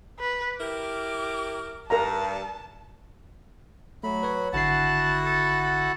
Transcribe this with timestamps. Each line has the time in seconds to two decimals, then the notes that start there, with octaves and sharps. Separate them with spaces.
0.20 B4
0.60 E4 G4 A#4 D6
1.90 G2 A#4 F5 A5 A#5
4.04 F#3 A3 B5
4.23 B4 C#5
4.53 G#1 D3 E4 F#4 F#5 A5 C7
5.25 A4
5.60 A4